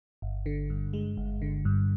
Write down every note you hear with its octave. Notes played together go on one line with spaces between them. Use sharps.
G1
D3
G2
G#3
G1
D3
G2